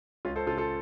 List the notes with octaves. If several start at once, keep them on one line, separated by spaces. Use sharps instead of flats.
C#2 C#4 F4
A4 C5
C#3 F4 A4
F4 A4